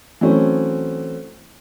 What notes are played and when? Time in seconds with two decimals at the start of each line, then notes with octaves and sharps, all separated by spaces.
0.21 E3 F#3 A3 C4 C#4